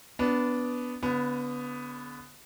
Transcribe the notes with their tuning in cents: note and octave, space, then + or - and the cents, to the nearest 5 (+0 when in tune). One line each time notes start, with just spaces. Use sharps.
B3 +0 D4 -15
D3 -35 B3 +5